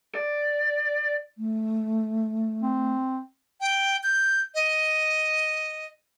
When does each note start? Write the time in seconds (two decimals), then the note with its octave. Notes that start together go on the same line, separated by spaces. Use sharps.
0.15 D5
1.38 A3
2.62 C4
3.61 G5
4.03 G6
4.55 D#5